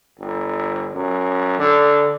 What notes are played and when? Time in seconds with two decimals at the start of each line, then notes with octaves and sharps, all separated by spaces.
0.20 G1
0.93 F#2
1.59 D3